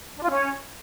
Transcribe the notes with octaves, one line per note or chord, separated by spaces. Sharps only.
D4
F4
C#4